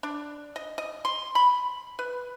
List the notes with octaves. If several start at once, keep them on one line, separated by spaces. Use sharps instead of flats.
D4
D#5
D#5
C6
B5
B4